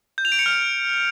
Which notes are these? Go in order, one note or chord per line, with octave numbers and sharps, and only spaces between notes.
G6
F7
D7
C#7
F6